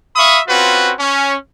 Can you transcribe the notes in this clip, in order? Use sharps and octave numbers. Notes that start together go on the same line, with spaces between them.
E5 F5 B5 C#6 D#6
C4 C#4 F4 F#4 B4
C#4